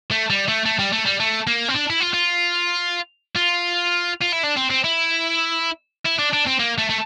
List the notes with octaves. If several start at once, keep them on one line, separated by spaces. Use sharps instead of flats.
A3
G3
A3
A3
G3
A3
G3
A3
A#3
C4
D4
E4
F4
F4
F4
F4
E4
D4
C4
C4
E4
E4
D4
D4
C4
A#3
A3
A3